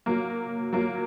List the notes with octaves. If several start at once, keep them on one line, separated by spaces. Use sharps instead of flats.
F#3 A#3
F#3 A#3